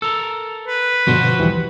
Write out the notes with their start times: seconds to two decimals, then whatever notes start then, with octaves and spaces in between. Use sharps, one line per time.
0.02 A4 A#4 E6
0.68 B4
1.07 G2 B2 D3 F3 F#4 C5
1.39 D#2 E3 G3